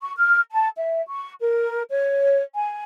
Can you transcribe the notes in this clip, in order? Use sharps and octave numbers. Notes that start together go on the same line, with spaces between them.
C#6
F6
A5
E5
C#6
A#4
C#5
G#5